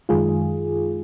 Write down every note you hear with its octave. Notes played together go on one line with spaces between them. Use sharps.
F#2 D#3 G#3 F4 G#4